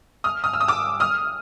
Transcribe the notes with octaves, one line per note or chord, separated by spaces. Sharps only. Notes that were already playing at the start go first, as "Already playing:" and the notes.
D#6 F6
D#6 F6
E6
D#6
D6 E6
D#6 F6